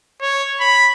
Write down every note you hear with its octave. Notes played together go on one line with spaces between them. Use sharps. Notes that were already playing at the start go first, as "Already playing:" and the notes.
C#5
B5